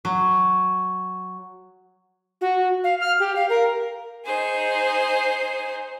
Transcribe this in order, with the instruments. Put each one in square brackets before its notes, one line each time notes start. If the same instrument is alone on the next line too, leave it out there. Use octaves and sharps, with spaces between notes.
[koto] F#3
[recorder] F#4
F5
F6
G4
F5
A#4
[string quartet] D#4 G#4 C5